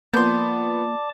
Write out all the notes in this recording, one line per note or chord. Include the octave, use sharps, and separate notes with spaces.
F3 A#3 B3 D5 A5 C6 D6 G6